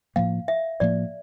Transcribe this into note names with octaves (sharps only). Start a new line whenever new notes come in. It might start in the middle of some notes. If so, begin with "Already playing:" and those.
A2 F3 A#3 F5
E5
A2 F3 A#3 D5